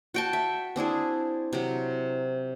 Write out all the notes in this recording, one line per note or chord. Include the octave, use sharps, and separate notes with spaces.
F#4 G5 A5
E5
C4 D4 E4 G#4
C3 F#3